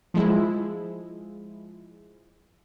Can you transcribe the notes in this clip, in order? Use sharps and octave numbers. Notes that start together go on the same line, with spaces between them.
F3 G#3 E4